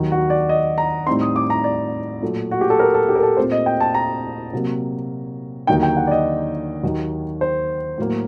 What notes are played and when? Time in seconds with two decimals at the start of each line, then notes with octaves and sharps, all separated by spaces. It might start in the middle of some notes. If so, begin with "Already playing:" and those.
Already playing: D#2 D#3 F#3
0.12 F#4
0.30 D5
0.49 D#5
0.78 A#5
1.07 A2 G3 C4 D#4 C6
1.21 D#6
1.36 D6
1.50 A#5
1.64 D5
2.22 A#2 F#3 A3
2.51 F#4
2.61 G4
2.70 A4
2.79 A#4
2.94 A4
3.09 G4
3.15 A#4
3.23 A4
3.37 A#2 A3 C4 C5
3.52 D#5
3.66 G5
3.80 A5
3.94 A#5
4.53 C3 F#3 A#3
5.67 D#2 D3 F#3 A#3 D#4 G5
5.83 G5
5.97 F#5
6.07 D5
6.11 D#5
6.83 D#2 D#3 F#3
7.41 C5
7.98 A2 F#3 A#3